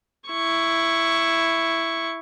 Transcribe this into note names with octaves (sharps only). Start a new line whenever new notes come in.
E4 C#6